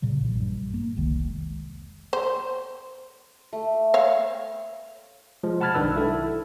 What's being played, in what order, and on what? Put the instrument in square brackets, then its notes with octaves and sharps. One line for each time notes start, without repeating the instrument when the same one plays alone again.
[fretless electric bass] A#2 C#3 F#3
A#1 E3
G2
A#3
F1 C2 D#3 G#3
[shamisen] C5
[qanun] A3
[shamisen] C#5 F5
[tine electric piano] F3 G#3
F#5 A5 B5 F6 G#6 A6
B1 D#3 D4 B4 E6
E4 A4